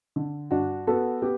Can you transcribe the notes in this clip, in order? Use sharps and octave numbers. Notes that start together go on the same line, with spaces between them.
D3
G2 D4 F#4
B3 F#4 A4
B3 G4